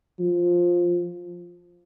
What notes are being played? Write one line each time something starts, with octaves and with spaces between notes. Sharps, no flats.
F3